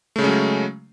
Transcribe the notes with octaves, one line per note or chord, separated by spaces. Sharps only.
C#3 F#3 G#3 A3 C#4